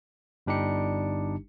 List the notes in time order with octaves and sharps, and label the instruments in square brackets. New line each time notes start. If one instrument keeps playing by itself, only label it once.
[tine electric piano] G1 G3 D4 D#4 G4 C#7